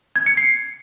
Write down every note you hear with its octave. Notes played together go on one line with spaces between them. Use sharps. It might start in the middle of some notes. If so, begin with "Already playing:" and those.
G#6
C#7
C7